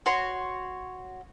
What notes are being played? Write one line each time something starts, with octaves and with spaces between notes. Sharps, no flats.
F#4 C#5 C6